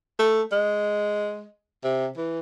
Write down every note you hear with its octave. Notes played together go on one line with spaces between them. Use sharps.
A3
G#3
C3
E3